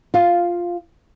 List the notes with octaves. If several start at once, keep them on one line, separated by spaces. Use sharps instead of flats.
F4 F5